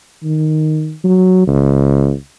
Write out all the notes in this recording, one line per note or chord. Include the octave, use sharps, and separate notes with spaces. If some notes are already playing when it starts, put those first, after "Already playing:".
D#3
F#3
C#2